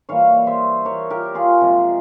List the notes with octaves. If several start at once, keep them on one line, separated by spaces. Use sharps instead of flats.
E3 G3 A#3 C#5 F5
C5 E5
A#4 C#5
G4 A#4
F4 G#4
C3 F3 G#3